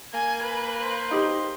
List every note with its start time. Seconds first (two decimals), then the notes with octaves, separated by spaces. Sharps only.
0.14 A#3 G#5
0.43 B4
0.82 C5
1.11 D#4 G4